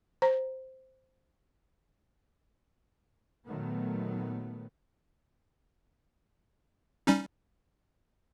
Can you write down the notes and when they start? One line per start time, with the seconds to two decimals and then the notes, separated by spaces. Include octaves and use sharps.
0.22 C5 A#5
3.47 A#2 D#3 F#3 A3 B3
7.07 G3 C#4 D#4